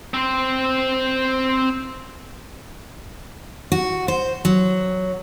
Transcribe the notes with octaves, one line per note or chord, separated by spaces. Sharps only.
C4 C5
F#4
C5
F#3